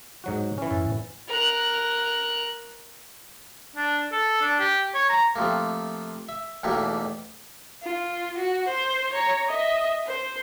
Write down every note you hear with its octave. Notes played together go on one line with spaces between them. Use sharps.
G#2 F#3 F#4
E3 C#4
F#2 A2
A#4 F#6
D4
A4
D4
G4
C#5
A#5
C3 F3 A3 A#3
E5
B1 E2 B2 A3 A#3 G4
F4
F#4
C5
C#5 A#5
D#5 E5
C5